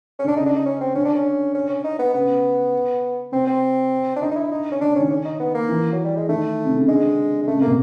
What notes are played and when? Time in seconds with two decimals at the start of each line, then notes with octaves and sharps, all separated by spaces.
0.19 C#4
0.24 D3 D4
0.36 C#3 D#4
0.46 D4
0.56 D#4
0.66 C#4
0.81 C4
0.95 D3 C#4
1.05 D4
1.15 C#4
1.54 C#4
1.69 C#4
1.84 D#4
1.99 B3
2.14 C#3 B3
3.32 C3 C4
3.47 C4
4.16 D4
4.21 D3 D#4
4.31 D#4
4.36 E4
4.51 D#4
4.72 C#4
4.81 D3 D4
4.90 C#3
4.96 D#3 C#4
5.10 C#4
5.25 D#4
5.40 B3
5.54 A#3
5.69 E3
5.93 F#3
6.05 G3
6.17 G#3
6.29 D#3 A3
6.65 C3
6.76 C#3
6.88 D3 G#3
7.43 G#3
7.47 C#3 A3
7.58 C3
7.62 A#3
7.67 B2